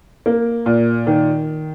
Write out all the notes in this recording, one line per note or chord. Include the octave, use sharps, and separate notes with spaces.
A#3
A#2
D#3